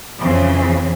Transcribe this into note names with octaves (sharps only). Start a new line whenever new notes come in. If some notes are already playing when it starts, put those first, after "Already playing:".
F2 C#3 E3 C4